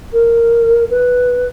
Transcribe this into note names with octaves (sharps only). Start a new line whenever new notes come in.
A#4
B4